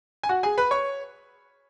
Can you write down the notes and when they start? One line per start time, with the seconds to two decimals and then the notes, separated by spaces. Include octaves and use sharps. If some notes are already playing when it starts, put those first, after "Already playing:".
0.23 G#5
0.29 F#4 F#5
0.43 G#4 G#5
0.58 B4 B5
0.71 C#5 C#6